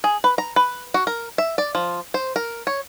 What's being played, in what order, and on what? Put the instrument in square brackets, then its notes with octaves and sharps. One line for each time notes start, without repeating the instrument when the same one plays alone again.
[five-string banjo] G#4
B4
A#5
B4
F#4
A#4
E5
D5
F3
C5
A#4
C#5